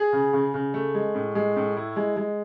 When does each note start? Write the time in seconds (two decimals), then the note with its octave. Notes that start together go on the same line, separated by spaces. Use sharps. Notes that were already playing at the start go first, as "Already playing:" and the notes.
Already playing: G#4
0.13 C#3
0.33 C#3
0.54 C#3
0.74 A3
0.95 G#3
1.15 A2
1.35 G#3
1.56 A2
1.77 E4
1.96 G#3
2.16 G#3